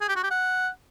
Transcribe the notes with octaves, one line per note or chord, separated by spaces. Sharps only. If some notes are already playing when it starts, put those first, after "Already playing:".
G#4
G4
F#4
G4
F#5